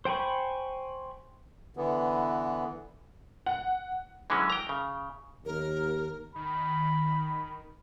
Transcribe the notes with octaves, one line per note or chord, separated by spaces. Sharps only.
C5 G5 G#5 B5 C#6
D3 E3 B3
F#5
D3 E3 F#3 G#3 C#4
G5 A#5
C#3
D#2 A#4
D#3 B5